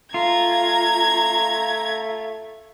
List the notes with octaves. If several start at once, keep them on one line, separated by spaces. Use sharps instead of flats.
A3 F4 A#5 G#6